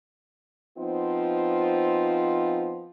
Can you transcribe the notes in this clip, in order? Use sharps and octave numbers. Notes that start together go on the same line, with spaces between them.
F3 B3 C4 D#4 F4